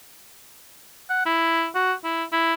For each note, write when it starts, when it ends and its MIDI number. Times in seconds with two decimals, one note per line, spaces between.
1.10 1.22 78
1.26 1.67 64
1.75 1.93 66
2.04 2.24 64
2.32 2.54 64